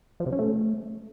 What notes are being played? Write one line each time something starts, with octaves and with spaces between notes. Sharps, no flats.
F3
C3
C#4
A3